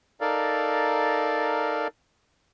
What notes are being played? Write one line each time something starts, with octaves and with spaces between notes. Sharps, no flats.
D#4 A4 A#4 D5 F5